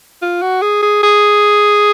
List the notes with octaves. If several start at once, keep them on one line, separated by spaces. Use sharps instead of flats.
F4
F#4
G#4
G#4
G#4